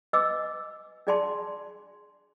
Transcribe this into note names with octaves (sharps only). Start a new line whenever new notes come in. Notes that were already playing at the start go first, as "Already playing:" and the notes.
B4 D#5 G#5 D6 E6
D4 G#4 D5 G#5 A5 C6